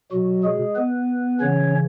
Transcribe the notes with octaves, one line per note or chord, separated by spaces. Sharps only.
B2 F#3 F#4
G#3 G#4
B3 B4
C#3 E3 C#4 C#5